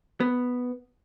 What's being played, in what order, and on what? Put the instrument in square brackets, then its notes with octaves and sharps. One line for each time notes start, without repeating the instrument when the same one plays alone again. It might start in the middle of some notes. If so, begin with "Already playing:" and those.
[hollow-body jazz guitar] B3